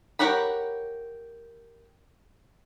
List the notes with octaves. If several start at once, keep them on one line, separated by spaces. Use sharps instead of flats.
G4 A#4 C#5 F#5 B5